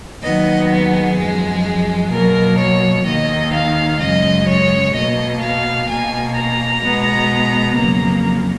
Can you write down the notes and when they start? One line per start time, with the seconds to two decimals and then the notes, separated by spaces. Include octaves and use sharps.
0.22 D#2 D#3 F#3 B3 D#5
0.86 G#4
1.17 F#2 F3 G#3
2.11 B2 F#3 A#3 A#4
2.58 C#5
3.05 D#2 D#3 A#3 D#5
3.52 F5
4.00 F#2 C#3 G#3 D#5
4.47 C#5
4.94 B2 A#3 D#5
5.41 F5
5.88 B2 A#3 G#5
6.36 A#5
6.83 B2 G#3 B3
7.77 F2 C#3 F#3 A#3 A#5